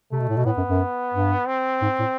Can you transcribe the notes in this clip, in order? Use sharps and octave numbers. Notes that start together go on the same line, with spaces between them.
C3 A3
B2
A2
B2
A2 B3
F#2
F#2
G2
C4
G#2
A2